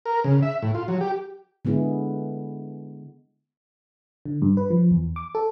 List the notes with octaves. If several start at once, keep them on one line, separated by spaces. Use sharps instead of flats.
A#4
C#3
E5
A2
F4
F#3
G4
D3 G#3 B3 E4 G#4
D3
G2
B4
F3
E2
D6
A4